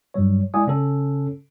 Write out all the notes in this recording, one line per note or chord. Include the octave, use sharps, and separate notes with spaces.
G2 F#3 G3 C#5
G#3 E4 D5 F#5 G#5 D#6
C#3 C#4 A4